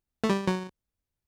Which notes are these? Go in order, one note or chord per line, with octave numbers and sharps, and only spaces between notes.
A3
G3
F#3